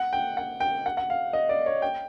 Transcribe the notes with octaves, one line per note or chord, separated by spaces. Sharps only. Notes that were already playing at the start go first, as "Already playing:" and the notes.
Already playing: F#5
G5
F#5
G5
F#5
F#5
F5
D#5
D5
C#5
G5